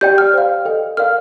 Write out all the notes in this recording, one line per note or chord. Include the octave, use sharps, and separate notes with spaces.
G4 D5 G5 G6
F6
C5 F5
A4 D#5 G5
A#4 D5 F5 F6